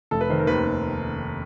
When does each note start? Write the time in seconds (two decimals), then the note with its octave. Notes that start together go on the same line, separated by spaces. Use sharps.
0.11 F1 A4
0.21 B4
0.30 D#3 C5
0.39 A#4
0.47 D#2 B4